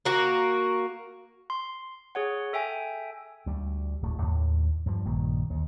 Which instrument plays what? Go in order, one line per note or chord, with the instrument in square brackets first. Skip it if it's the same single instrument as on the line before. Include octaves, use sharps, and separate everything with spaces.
[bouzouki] A#3 F#4
[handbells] C6
G#4 C#5 F#5
A4 E5 G5 G#5
[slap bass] D2 G3
D1 A3
D#2 A2
G2 F3
A#1 G2 D#3 A#3
D#2